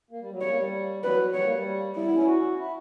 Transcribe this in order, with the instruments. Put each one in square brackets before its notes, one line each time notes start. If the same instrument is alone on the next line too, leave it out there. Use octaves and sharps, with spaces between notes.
[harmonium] A#3
G3
F#3
[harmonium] G3 [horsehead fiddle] C#5
[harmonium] A#3
G3
[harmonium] F#3 [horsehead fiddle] B4
[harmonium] G3 [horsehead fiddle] C#5
[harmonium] A#3
G3
[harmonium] G3 [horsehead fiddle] E4
[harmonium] B3
C#4
F#4
E4